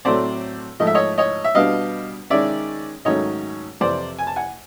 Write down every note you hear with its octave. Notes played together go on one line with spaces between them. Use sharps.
A2 F#3 A3 C4 C5 D5
G#2 F3 A3 D#5
E5
C#5 D#5
C#5 D#5
E5
B2 G3 B3 D4 D#5 F5
D#3 G#3 C#4 D5 E5
G#2 D#3 F#3 A3 C#4 C#5 D#5
F2 C3 E3 C5 D5
G#5
A5
F#5 G#5